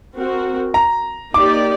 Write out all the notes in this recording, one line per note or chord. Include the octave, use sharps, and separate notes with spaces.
C4 F#4 A#4
A#5
A#3 D#4 G4 D5 D6